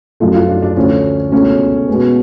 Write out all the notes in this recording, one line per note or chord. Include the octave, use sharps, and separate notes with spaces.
F#2 F3 A3 F4
F4
D4
D4
D2 D3 F3 C#4
C#2 B2 A3 C#4
B2 G#3 B3